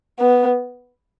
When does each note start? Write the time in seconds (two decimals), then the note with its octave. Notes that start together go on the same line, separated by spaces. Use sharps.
0.19 B3